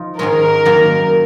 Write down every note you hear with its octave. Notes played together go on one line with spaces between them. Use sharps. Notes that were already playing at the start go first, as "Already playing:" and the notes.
Already playing: F3 D#4
G#2 D#3 G#3 C#4 A#4
F#2 D#3 A#3